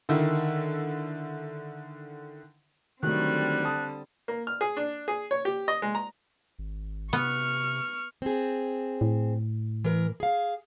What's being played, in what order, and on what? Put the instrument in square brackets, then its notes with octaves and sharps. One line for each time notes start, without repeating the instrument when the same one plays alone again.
[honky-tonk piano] D3 D#3 E4
[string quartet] D3 G3 C4 [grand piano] D#3 F#3 A3 [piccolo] F#6
[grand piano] A5 D#6
[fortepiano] A#3
F6
G#4
D4
G#4
C#5
G4
D#5
G#3
A#5
[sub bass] G#1
[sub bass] C3 [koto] B3 [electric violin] C#6 F6
[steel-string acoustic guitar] C4 G#4
[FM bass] A2
[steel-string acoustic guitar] E3 A#4
G#4 F5